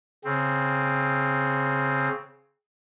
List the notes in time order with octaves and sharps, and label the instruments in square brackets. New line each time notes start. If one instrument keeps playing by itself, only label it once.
[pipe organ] C#3 C4